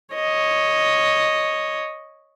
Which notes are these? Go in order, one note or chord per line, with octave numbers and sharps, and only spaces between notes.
C#5 D#5